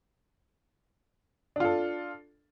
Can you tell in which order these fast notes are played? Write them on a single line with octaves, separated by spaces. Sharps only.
D4 F4 A4